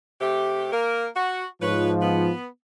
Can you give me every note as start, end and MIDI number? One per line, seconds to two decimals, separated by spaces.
0.21 0.72 48
0.21 0.72 57
0.21 0.72 67
0.73 1.06 58
0.73 1.06 70
1.16 1.46 66
1.62 2.31 44
1.62 2.31 53
1.62 1.91 71
1.62 1.91 73
2.02 2.46 59